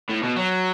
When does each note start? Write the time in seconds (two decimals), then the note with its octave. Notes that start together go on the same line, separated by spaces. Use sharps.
0.10 A2
0.23 B2
0.36 F#3